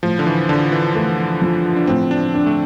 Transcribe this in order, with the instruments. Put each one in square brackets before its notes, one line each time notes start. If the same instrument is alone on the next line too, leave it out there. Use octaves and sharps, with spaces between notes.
[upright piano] A2 [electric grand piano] F3
[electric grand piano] D3
E3
[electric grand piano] D3 [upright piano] D4
[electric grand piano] E3
[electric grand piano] E3 [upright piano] A3
[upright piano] F3
[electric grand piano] D4
[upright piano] A2 [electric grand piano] C4
[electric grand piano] D4
[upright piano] D4
[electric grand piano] A3